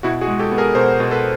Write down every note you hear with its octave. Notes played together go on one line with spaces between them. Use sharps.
B2 E4 F#4
F#4 G#4
G#3
G4 A4
B3
G#4 A#4
B2 A#4 C5
B2
A4 B4